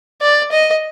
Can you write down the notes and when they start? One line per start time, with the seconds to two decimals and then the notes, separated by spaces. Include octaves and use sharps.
0.22 D5
0.51 D#5